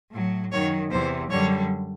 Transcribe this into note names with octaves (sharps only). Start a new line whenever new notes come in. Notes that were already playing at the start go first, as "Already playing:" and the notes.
A2 F#3
F#2 D#3 F#3 C#5
E2 C3 E3 C5
F#2 D3 G3 C#5